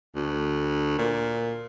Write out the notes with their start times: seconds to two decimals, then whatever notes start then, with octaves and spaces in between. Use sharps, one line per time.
0.15 D2
0.98 A#2